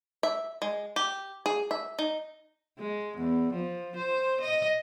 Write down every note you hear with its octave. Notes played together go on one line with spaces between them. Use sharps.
E5
G#3
G4
G#4
E5
D#4
G#3
E2
F3
C5
D#5